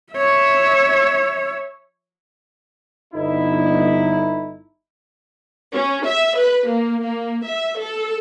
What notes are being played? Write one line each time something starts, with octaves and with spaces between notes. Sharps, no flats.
C#5 E5
G1 D#4 E4
C#4
E5
B4
A#3
A#3
E5
A4